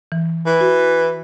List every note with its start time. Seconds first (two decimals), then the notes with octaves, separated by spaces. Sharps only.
0.12 E3
0.46 E3
0.61 F#4